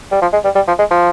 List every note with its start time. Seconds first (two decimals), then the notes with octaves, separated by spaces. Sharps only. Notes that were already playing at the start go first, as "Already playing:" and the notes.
0.12 G3
0.22 F3
0.33 G#3
0.44 G3
0.55 G3
0.67 F3
0.78 G#3
0.91 F3